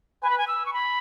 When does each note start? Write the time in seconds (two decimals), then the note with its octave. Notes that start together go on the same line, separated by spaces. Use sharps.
0.22 B4 G#5
0.30 B5
0.38 G#5
0.48 E6
0.66 C#6
0.73 B5